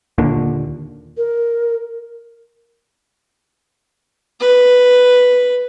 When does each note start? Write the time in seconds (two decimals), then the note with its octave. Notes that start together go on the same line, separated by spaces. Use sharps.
0.18 D#2 A#2 D3
1.17 A#4
4.40 B4